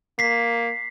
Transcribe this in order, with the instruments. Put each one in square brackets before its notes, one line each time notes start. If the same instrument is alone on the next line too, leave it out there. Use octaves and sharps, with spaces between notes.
[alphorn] A#3 [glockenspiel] B6 C7